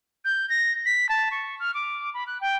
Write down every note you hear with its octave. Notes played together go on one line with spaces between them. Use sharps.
G6
A#6
B6
A5
C#6
F6
D6
B5
F#6
G5